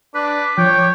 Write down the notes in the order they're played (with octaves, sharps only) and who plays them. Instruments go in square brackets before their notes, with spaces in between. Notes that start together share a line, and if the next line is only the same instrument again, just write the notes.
[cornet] D4 [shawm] B4 [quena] D6
[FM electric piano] F3 [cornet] C#5 [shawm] G5